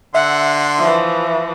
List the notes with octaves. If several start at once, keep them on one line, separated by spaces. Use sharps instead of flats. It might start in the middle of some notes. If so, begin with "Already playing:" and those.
D3 E5 F#5 C6
E3 F3